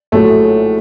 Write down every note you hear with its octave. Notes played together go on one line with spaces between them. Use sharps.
A#1 A2 F#3 A3